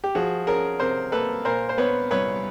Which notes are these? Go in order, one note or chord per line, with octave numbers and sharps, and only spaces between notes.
G4
F3 F#4 G#4
C#4 G#4 A#4
C3 A#4 C5
A#3 A4 B4
A#2 A#4 C5
C5
B3 B4 C#5
C2 B4 C#5